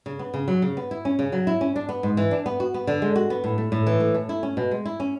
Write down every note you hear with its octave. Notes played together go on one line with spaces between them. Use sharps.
C#3
B3
C#3
F#3
C#3
B3
E4
C#4
C#3
F#3
E4
C#4
D4
B3
G#2
E3
D4
B3
F#4
B3
D3
G#3
F#4
B3
A2
A3
A2
E3
A2
A3
E4
C#4
B2
G#3
E4
C#4